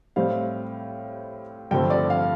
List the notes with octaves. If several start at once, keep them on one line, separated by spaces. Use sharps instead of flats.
A2 G3 C4 F5
G2 D3 F3 A3 C4 G5
D5
F5